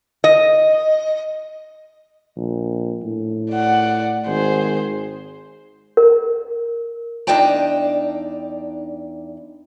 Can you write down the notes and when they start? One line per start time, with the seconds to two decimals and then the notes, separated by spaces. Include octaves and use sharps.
0.24 D#5
2.37 A#1
3.03 A2
3.51 D5 F#5
4.27 G#1 G#4 C5
5.97 A#4
7.27 E2 D4 D#4 D5 G5 A5